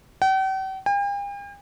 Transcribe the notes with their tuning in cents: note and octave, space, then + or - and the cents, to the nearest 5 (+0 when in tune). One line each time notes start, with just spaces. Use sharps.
G5 -45
G5 +45